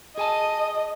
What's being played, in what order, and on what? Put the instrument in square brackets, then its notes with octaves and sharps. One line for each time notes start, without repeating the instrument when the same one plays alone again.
[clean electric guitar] G#4 G#5 A5 [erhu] D#5